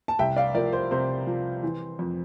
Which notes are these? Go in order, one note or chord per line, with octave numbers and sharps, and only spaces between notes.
A5
C2 E5 G5
D5 F5
F3 A#4 D5
C5
C3 C5
F3
E3
F2